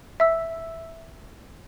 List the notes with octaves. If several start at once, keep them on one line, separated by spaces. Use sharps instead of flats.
E5 E6